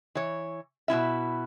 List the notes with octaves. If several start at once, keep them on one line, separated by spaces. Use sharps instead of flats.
E3 C#5
B2 C#4 E4 E5